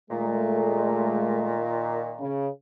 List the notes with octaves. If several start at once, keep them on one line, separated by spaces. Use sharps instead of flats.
A#2 D#3 G#3 A3
C#3